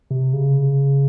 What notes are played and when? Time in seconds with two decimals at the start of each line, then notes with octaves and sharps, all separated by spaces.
0.11 C3
0.33 C#3